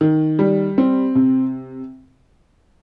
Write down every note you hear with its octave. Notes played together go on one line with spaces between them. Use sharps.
D#3
G3
C4
C3